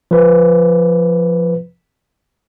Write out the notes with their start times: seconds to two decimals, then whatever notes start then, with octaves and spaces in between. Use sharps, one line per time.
0.11 F3 B4